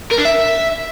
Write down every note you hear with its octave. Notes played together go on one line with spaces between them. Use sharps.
A#4
D4
E5